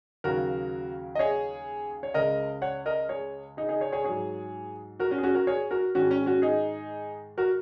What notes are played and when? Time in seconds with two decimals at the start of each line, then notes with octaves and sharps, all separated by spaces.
0.24 D#2 C#3 F#3 F#4 A#4
1.15 D#5
1.19 G#4 C#5
2.03 C#5
2.14 C#2 C#3 G#3 A#4 D#5
2.62 C#5 F#5
2.86 A#4 D#5
3.09 G#4 C#5
3.57 D#4 G#4
3.69 D#4 G#4
3.80 G#4 C#5
3.92 G#4 C#5
4.04 G#2 F#3 G#4 C#5
5.00 F#4 A#4
5.11 C#4 F#4
5.18 G#4
5.23 C#4 F#4
5.35 F#4 A#4
5.47 G#4 C#5
5.71 F#4 A#4
5.95 G#2 D#3 G#3 C#4 F#4
6.11 C#4
6.26 C#4 F#4
6.42 D#4 G#4
7.38 F#4 A#4